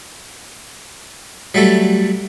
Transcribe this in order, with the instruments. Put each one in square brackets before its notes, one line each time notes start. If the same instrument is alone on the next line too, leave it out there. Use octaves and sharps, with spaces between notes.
[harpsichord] F#3 G3 A3 A4